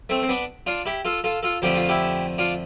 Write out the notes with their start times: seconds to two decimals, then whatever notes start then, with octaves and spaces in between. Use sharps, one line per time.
0.09 A3 C4
0.22 C4
0.29 B3 D4
0.67 D4 F4
0.86 E4 G4
1.05 F4 A4
1.24 F4 A4
1.43 F4 A4
1.62 F2 D3 F3 A3 G4
1.75 F4
1.89 E4 G4
2.38 D4 F4